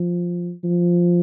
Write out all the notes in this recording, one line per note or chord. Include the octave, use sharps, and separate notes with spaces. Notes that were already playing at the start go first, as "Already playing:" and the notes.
Already playing: F3
F3